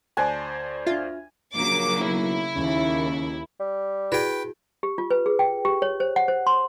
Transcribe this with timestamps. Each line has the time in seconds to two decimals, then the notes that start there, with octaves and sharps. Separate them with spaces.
0.17 D2 C5 D5 G#5 A5 F#6
0.87 D4 F4 E5
1.56 A#1 C#3 F#3 A#3 D6
2.03 B1 E4
2.55 D#2 C#3
3.60 G3
4.12 E4 F#4 G#4 B4 G5
4.83 G4
4.98 F4
5.11 B4
5.26 G#4
5.39 G5
5.65 G4
5.82 C#5
6.00 C5
6.16 F#5
6.28 C5
6.47 C6